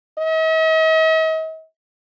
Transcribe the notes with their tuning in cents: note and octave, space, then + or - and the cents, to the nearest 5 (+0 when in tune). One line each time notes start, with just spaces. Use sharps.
D#5 +45